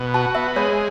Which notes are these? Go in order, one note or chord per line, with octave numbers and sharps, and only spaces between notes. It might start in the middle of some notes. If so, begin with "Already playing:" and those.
Already playing: B2
F#4 A5
B3 E5
G#3 C#5